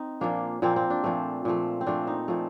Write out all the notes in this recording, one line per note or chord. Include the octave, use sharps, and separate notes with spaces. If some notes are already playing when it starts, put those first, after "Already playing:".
Already playing: C4 D#4
A#2 F3 A#3 D4
A#2 F3 A#3 C4
C4
D4
A#2 F3 A3
A#2 F3 A3
C4
A#2 F3 A3 D4
D#4
A#2 F3 A3